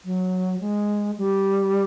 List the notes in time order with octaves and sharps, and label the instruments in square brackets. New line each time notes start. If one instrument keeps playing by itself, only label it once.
[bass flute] F#3
G#3
G3